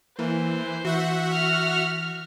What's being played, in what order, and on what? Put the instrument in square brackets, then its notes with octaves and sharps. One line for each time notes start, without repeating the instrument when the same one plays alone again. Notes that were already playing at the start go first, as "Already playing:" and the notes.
[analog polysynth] E3 [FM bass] A#3 [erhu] C5
[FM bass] E3 [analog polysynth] F#4 E5 F#5
[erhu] F6